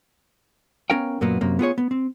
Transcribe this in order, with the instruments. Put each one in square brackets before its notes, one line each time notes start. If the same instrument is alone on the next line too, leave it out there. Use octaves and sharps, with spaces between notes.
[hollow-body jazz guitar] B3 C#4 A#4 F5 G5
F#2 A#2 F#3 A#3 B3
F#2 C3 A#3
B3 F4 G#4 C#5
B3
C4